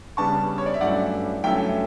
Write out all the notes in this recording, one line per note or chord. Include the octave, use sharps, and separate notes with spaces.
C#3 G3 B3 D4 A5 C#6
C#5
D5
E5
G2 F#3 A3 C#4 E4 D5 F#5
G2 F#3 A3 C#4 E4 E5 G5